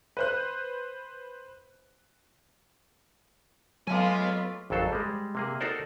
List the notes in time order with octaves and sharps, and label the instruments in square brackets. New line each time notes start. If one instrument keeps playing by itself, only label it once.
[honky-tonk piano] B4 C5 F#6
[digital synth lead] F#3 [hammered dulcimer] A3 F5 D6 [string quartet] B3 F4 [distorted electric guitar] D#5 G#5
[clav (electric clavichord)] G#1 F2 F#3 A4 C5
G3 G#3
C3 A#3 G#4
D#4 F#4 A4 A#4 C5 D5